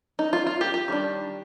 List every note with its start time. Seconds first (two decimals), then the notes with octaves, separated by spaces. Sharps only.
0.19 D#4
0.33 F4
0.47 F4
0.61 G4
0.74 G4
0.88 D#3 G3 D4